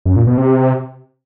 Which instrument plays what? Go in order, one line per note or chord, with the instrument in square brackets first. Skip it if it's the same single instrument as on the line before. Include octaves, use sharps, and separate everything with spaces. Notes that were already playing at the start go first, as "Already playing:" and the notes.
[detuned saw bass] F#2
A#2
B2
C3